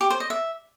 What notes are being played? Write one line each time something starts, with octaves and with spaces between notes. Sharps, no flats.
G4
C5
D#5
E5